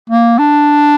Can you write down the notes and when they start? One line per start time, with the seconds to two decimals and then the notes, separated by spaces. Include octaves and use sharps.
0.10 A#3
0.39 D4